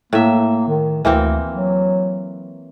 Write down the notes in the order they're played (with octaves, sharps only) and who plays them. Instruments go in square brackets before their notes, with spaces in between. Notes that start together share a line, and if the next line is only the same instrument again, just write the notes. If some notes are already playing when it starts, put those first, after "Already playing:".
[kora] A2 E5 [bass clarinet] A#3
[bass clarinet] D#3
[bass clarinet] D2 [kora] E3 A#3 C4
[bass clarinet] F#3